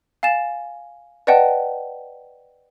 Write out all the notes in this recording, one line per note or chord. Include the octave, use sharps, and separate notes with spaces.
F5 G#5 A6 E7
B4 D5 D#5 F#5 G5 A5